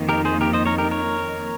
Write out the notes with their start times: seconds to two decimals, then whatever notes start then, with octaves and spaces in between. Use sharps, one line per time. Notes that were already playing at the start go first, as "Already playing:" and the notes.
Already playing: F2 D#3 A#3 D#4
0.09 G4 A#4
0.25 G#4 C5
0.41 G4 A#4
0.53 C5 D#5
0.66 A#4 C#5
0.78 G4 A#4
0.91 A#4 C#5